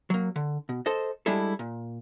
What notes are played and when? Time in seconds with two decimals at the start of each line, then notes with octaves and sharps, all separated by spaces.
0.10 F#3 A#3
0.36 D3
0.69 B2
0.86 A4 C5 D#5
1.26 G3 G#3 D4 E4 A4
1.59 A#2